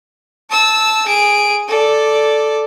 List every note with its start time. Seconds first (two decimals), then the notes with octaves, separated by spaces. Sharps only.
0.50 A5 E6
1.06 G#4 D7
1.68 A4 D5